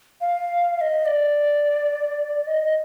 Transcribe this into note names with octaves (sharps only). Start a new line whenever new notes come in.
F5
F5
D#5
D5
D#5